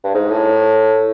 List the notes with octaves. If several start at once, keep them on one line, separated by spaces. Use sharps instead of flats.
G2
G#2
A2